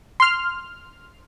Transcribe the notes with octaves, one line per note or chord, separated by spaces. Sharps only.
C6 F6